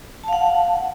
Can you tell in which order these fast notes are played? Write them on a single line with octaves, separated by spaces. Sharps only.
A5 F5 F#5